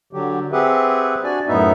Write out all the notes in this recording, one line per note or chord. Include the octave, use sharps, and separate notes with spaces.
D3 F#3 G4
C4 G4 G#4 B4 E5 F#5
D4 F#4 D5 G#5
F#2 A2 B3 D#4 E5